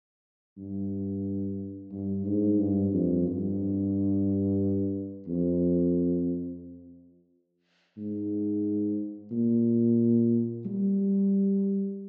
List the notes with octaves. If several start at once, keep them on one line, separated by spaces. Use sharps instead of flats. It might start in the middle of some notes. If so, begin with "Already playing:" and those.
G2
G2
G#2
G2
F2
G2
F2
G#2
A#2
G3